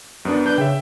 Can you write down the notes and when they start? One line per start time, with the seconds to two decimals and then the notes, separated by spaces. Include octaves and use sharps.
0.25 F#2 B3 D4
0.46 D4 B4 G6
0.58 C#3 E5 G5